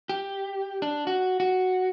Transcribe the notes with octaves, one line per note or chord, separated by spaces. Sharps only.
G4
D4
F#4
F#4